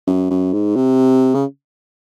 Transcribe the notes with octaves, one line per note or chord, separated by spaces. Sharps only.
F#2
F#2
G#2
C3
C#3